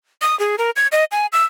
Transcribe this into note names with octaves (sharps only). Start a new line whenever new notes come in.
D#6
G#4
A#4
G#6
D#5
G#5
E6